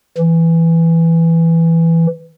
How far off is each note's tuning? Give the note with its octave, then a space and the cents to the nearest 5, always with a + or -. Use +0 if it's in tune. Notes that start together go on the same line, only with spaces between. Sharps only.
E3 +5